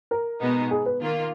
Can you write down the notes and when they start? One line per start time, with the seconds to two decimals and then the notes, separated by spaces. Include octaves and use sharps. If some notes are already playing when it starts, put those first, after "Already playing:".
0.11 A#4
0.40 B2 G#3 B3 D#4
0.71 G#4
0.86 B4
1.01 D#3 A#3 F4